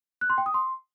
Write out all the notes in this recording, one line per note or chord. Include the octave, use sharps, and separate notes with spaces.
F#6
C6
G5
D#6
C6